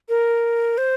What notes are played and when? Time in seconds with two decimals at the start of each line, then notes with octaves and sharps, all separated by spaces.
0.09 A#4
0.78 C5